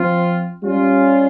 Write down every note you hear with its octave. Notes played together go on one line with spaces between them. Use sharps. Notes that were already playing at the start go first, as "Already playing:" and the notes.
Already playing: F3 C4 F4
G3 C#4 F4